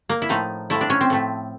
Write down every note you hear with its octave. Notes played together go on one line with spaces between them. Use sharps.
A#3
E4
A2 F3 A3 D#4
A2 F3 A3 E4
D4
C#4
C4
A2 F3 A3